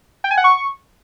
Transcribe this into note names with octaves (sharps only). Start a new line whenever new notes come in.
G5
G#5
F#5
C#6